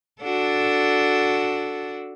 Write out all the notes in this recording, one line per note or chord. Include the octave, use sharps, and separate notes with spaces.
D4 F#4 A4